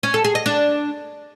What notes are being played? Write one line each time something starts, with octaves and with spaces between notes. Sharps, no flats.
C#4
A4
G#4
D#5
D4